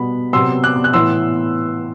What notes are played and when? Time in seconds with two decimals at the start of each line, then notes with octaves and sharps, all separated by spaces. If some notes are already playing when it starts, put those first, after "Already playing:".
Already playing: B2 G3 B3 B5
0.33 C3 F#3 B3 C6 E6
0.63 D6 F#6
0.84 F#6
0.93 A2 E3 B3 E4 C6 E6